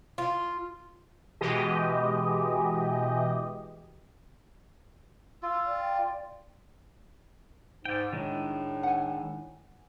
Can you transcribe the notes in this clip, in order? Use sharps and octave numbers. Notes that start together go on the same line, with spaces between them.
F4
B2 E3 G#3 G4 D#5
F4 E6
D5 G5
G#2 D5 G5
A2 D#3 G#3 D4
F#5 G#5